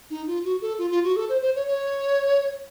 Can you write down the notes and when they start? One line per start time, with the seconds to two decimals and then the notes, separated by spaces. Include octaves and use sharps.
0.10 D#4
0.27 F4
0.44 F#4
0.61 A4
0.78 F4
0.91 F4
1.04 F#4
1.16 A4
1.29 C5
1.41 C5
1.55 C#5
1.67 C#5